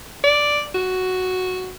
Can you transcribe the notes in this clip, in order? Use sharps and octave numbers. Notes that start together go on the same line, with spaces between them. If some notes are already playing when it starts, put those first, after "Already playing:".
D5
F#4